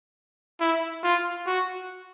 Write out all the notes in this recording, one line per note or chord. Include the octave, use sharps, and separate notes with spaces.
E4
F4
F#4